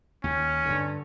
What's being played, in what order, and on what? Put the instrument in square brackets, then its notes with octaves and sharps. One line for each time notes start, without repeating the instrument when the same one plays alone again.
[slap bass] D#2 [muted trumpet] C#4
[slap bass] G2 D3